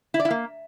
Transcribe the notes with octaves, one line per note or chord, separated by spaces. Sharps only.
E4
D5
E4
A#3